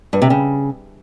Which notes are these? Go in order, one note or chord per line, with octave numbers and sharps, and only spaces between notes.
G2
C3
C#3